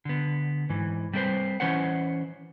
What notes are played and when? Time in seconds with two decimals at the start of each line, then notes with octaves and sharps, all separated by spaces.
0.05 D3 B3
0.69 G#2 E3
1.13 G3 C4 E4 G4 B4 C5
1.60 E3 C#4 B4 C5 F#5